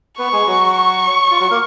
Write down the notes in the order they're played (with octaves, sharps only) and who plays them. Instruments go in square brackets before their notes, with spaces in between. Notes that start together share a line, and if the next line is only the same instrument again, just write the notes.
[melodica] B3 B4 [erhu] C#6
[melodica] G#3 G#4
F#3 F#4
[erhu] C#6
[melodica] F4
F#3 F#4
A#3 A#4